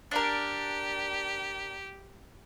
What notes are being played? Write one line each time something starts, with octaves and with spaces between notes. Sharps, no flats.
D4 G4 A#4